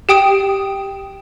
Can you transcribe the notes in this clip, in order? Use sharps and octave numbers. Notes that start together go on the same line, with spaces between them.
G4 G5 D#6 D7